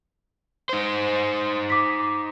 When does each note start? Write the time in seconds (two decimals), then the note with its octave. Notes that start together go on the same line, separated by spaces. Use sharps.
0.69 D#4 C5
1.70 D6 B6